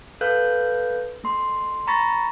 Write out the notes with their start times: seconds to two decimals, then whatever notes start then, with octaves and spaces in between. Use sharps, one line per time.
0.21 A4 B4 F5 F#6 G6
1.24 A3 C6
1.87 A#5 B5 C#6 A6 A#6